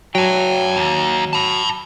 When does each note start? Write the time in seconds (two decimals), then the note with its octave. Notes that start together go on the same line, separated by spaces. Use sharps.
0.15 F#3 G5 A5
0.77 D#2
1.33 A5 B5